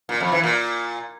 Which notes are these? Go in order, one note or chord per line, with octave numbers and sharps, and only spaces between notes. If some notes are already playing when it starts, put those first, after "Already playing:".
A#2
F2
E3
A#2